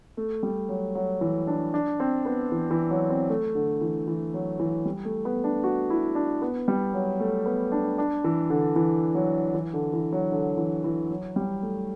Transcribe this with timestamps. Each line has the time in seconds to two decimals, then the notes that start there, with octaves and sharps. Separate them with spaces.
0.17 A3
0.43 G3
0.69 F#3
0.95 F#3
1.21 E3
1.47 D4
1.74 D4
2.00 C4
2.25 B3
2.52 E3
2.71 E3
2.90 F#3
3.10 C4
3.30 A3
3.55 D3
3.81 E3
4.08 E3
4.34 F#3
4.60 E3
4.85 G3
5.05 A3
5.25 B3
5.44 D4
5.64 F#4
5.90 E4
6.15 D4
6.42 B3
6.68 G3
6.94 F#3
7.20 A3
7.46 B3
7.72 D4
7.98 D4
8.24 E3
8.50 D3
8.76 E3
9.15 F#3
9.54 E3
9.74 D3
9.93 E3
10.13 F#3
10.32 D3
10.58 E3
10.84 E3
11.10 F#3
11.36 G3
11.63 A3